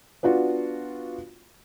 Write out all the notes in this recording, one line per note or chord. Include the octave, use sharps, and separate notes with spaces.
B3 D4 F4 F#4